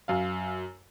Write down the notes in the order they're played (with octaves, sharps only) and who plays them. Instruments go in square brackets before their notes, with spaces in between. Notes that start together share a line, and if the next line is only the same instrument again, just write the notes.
[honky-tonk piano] F#2 F5